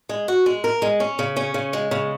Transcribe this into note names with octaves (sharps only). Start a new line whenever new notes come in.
G#3
F#4
G#3
A#4
G#3
C#4
C#3
C#4
C#3
G#3
C#3